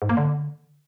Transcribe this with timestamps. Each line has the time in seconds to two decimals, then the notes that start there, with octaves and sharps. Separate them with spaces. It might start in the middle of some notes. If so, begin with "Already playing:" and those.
0.02 G#2
0.09 A#3
0.17 D3